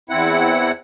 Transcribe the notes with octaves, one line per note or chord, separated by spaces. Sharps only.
E2 C4 E4 F#5